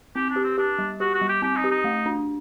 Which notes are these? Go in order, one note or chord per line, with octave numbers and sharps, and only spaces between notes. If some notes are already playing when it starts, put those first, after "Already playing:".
C4 G4
D4
G4
C4
D4 G4
G3
F#4 G4
F#4
G3
G4
C4 G4
D#4
G4
D#4
A3
D4